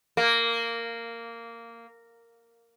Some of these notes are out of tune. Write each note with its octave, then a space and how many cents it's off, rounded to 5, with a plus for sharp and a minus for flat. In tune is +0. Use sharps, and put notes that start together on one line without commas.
A#3 -10